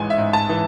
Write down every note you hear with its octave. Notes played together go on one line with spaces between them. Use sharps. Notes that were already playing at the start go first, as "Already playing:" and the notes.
Already playing: A1 G#2 E3 G#3 G#5
E5
G#2
A5
E3